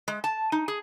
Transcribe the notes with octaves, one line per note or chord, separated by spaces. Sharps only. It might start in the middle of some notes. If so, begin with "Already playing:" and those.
G#3
A5
D#4
G#4